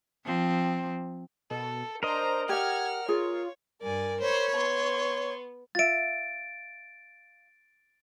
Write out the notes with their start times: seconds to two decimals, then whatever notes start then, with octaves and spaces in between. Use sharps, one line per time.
0.25 F3 C4
1.50 B2 A4
2.03 D4 A#4 C5 D#5 A#5
2.49 G4 F#5 G5 F6 G#6
3.08 F4 G#4 C#5
3.81 G2 A#4 D5 G#5
4.20 C5 C#5 B5 C#6
4.55 B3 C6 C#6
5.75 F4 E5 A6 D7